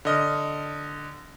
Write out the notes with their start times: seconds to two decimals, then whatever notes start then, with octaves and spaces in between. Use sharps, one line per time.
0.05 D3 D#5 F6